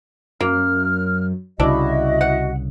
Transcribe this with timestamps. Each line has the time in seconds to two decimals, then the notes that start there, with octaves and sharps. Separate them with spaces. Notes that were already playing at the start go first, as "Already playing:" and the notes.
0.41 F#2 A#3 F6
1.60 C2 C#3 D4 E4 F#4 D#5
2.21 F#5